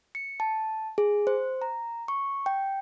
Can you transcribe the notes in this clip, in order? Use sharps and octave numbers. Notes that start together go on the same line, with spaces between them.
C#7
A5
G#4
C5
A#5
C#6
G5